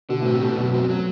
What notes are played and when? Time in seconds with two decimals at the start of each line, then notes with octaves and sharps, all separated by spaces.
0.09 B2 D3
0.21 A2 C4
0.31 B2
0.42 B2 A3
0.57 F#2 B2
0.73 B2 C4
0.90 F#3